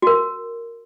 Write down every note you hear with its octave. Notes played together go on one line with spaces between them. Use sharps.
F#4 A#4